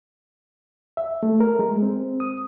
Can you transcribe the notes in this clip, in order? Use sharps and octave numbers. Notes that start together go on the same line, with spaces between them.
E5
A3
A#4
G#3
C4
D#6